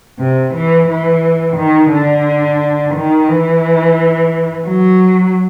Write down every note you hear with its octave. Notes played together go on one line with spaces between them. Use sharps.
C3
E3
E3
D#3
D3
D#3
E3
F#3